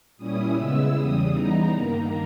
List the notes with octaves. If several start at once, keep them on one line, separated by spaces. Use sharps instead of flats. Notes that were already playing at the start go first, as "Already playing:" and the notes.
A#2 G3 C#4 E4 D#6
C#3 G#3 B3 E4 E6
E2 C#3 G3 D#6
C#3 E3 G3 B3 D#4 A#5
G2 D#3 A#3